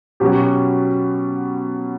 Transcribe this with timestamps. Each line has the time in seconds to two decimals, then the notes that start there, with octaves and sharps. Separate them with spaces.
0.20 B2 F#3 C#4 G4